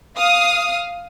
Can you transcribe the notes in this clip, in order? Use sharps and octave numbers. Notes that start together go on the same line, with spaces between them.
F5 D#6